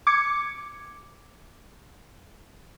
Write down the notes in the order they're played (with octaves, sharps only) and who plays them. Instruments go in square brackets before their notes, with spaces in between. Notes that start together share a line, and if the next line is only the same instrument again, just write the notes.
[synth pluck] D6 G#6 C#7